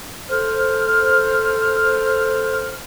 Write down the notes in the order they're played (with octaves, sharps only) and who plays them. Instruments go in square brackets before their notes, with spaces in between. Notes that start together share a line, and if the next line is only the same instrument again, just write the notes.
[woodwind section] A4 C5 F6